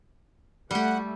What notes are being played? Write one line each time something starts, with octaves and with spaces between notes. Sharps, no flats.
G3 A3 G4 F#5